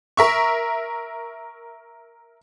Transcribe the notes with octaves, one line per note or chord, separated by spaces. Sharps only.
A#4 E5 C#6